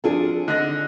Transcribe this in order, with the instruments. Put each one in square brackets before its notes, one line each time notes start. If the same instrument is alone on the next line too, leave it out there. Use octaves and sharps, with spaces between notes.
[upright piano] F3 F4 A4 [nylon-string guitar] C4 D4 G#4
[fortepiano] D3 [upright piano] D#5 A#6